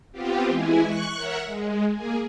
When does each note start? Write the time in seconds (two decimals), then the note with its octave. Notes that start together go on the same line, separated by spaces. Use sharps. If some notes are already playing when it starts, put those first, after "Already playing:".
0.12 B3 C4 F4 G4
0.48 E3 G#3 E4 G#4
0.82 C#6 F#6
1.16 A#4 C#5 E5 F#5
1.45 G#3
1.92 A#3 G#4